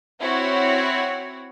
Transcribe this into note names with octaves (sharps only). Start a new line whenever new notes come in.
C4 E4 F#4 C#5